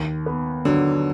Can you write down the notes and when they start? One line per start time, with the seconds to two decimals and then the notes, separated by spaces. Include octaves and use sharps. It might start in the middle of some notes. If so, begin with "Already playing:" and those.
Already playing: D#2
0.26 B3
0.65 D3 F#3